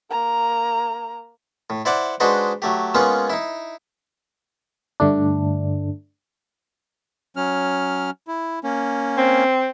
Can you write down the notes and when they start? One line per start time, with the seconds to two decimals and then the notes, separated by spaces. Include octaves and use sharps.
0.10 A#3 A#5
1.70 A2
1.85 E4 C5 D5 F#5 D6
2.20 G#3 D4 D#4 F#4 B4 C5
2.62 F#3 A3 G4
2.94 G#3 A#3 B3 C#4 F4 G#4
3.30 D#4 E4
5.00 G2 D3 A3 D4
7.36 F#3 C#4 F6
8.28 E4
8.64 A#3 C#4
9.17 C4